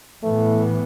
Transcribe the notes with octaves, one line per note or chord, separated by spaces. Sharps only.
A2 E3 A3 B3